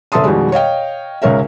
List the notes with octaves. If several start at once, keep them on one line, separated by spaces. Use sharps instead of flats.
F#1 A4 E5 A5 C6 D#6
F2 B2 D#3 G3 G#3
C#5 D#5 F5 G5
C#2 G#2 C#4 A#4 E5